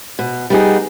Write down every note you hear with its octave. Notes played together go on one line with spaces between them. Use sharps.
B2
G3 B3 D#4 G#4